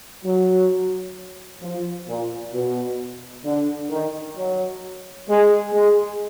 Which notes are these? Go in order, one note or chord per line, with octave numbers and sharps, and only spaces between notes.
F#3
F3
A#2
B2
D3
D#3
F#3
G#3
G#3